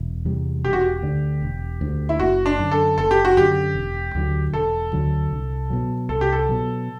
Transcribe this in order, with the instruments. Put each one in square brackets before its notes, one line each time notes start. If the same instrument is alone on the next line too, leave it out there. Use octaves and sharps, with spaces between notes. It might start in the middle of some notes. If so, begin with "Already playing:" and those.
Already playing: [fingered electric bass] E1
E2 C3 G3
[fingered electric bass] E1 [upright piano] G4
[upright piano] F#4
G4
[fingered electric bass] D2 D3
E1
D2 D3
[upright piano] E4
[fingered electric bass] F#1 [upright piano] F#4
[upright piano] D4
[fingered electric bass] F#2 D3
[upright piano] A4
[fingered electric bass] F#1 [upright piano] A4
[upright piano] G4
F#4
[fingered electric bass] F#2 D3 [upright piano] G4
[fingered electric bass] E1
D2 D3 F#3
[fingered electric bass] E1 [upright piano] A4
[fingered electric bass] D2 D3 F#3
C2
B2 F#3
[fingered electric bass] C2 [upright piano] A4
[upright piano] G4
A4
[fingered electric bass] B2 F#3